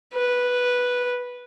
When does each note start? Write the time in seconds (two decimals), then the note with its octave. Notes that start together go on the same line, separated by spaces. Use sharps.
0.14 B4